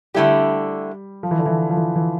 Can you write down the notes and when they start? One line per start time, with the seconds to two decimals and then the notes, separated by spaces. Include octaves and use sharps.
0.14 D3 G3 A3 E4 G4
1.23 F3
1.31 E3
1.38 D3
1.46 E3
1.70 F3
1.77 E3
1.96 E3